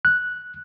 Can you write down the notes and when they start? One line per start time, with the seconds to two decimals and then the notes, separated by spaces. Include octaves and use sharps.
0.05 F#6